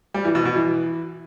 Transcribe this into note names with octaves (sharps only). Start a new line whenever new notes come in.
G3
E3
B2
B2
E3